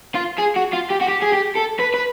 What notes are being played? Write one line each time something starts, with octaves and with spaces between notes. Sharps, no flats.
F4
G#4
F#4
F4
G4
F#4
G4
G#4
G4
A4
B4
B4